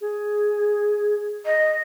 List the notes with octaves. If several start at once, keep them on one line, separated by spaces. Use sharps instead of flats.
G#4
D#5